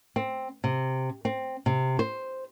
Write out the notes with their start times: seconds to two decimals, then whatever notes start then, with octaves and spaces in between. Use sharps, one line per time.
0.16 C4
0.64 C3
1.25 C4
1.66 C3
1.99 C5